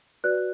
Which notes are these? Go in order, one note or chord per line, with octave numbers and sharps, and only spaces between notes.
F#4 B4 D5 F#6